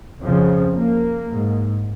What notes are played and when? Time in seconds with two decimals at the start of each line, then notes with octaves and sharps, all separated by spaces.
0.22 F2 C#3 F3
0.75 A#3
1.30 G#2